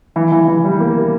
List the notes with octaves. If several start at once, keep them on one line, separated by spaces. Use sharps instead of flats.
E3
E3
E3
G3
A#3